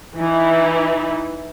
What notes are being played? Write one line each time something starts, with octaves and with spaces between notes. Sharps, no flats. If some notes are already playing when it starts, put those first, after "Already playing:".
E3 D#4 E4